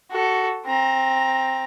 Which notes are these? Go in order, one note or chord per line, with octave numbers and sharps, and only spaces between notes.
F#4 A4
C4 A#5